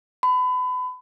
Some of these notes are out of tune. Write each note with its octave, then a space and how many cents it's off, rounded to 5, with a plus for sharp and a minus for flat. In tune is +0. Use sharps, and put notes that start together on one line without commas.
B5 +30